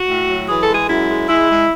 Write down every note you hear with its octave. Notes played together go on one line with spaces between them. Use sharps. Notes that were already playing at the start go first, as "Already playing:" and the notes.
Already playing: F#4
A2
F#3
E3 G#4
A4
G#3
G#4
F#2 E4
G#3
G#3 E4
G#3